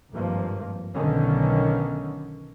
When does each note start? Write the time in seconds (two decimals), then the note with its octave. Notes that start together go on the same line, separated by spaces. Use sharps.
0.12 G#1 G2 F3 A#3
0.94 B1 D3 D#3 C#4